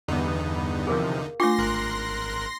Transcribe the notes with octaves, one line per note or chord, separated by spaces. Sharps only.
E2 G2 D3 B3 D#4
E2 C3 F3 G#4 A#4 F5
A3 D4 F4 C6 D6 A#6
G#1 A#4 F#6